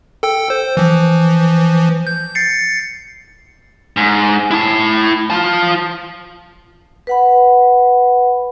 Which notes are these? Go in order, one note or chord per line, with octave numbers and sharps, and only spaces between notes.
A4 G5 E6
C5
E3 F3
G6
A6 C7 C#7
G#2
E4 A5
F4 A5
B4 F#5 B5